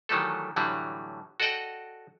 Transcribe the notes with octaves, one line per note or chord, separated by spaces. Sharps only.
D#3 E3 F#3 G3 A3 A4
A2 D3 E3 F#3 G3
F#4 A4 D5 D#5 F#5 G5